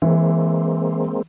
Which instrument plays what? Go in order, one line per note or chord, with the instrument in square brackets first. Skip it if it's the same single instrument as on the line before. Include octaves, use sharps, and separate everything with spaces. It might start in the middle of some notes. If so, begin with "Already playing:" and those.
[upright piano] E3 [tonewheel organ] G#3 A#3 C4